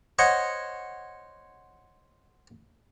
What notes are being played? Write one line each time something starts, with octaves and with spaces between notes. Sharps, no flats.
C5 C#5 D#5 F#5